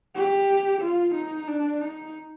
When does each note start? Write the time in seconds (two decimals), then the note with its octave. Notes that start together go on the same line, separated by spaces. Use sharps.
0.15 G4
0.81 F4
1.15 D#4
1.48 D4
1.81 D#4